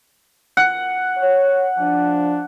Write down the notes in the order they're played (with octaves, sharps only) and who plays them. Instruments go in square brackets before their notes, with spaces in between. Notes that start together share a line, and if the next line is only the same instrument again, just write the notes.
[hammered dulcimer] F#5
[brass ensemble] C#5
F3 D4